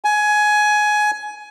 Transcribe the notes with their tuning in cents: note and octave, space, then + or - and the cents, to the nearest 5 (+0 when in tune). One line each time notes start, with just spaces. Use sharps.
G#5 +15